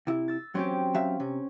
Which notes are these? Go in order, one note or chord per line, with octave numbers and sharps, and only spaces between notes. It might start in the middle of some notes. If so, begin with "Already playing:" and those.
C3 E4
E6 A6
F#3 C4 C#4 G4
F#3 E5 F5
C3 C#4